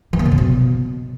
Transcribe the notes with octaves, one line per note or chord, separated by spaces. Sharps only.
E3
A#3
C3
C#3
B2